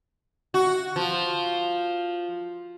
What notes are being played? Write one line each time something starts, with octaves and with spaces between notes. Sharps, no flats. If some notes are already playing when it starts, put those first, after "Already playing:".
F#4
F3